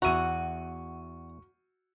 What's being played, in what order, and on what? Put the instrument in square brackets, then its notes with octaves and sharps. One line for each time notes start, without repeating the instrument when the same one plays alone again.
[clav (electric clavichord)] E2 E5 A#5 [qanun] F#4 [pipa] F#5 [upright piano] C#6 D#7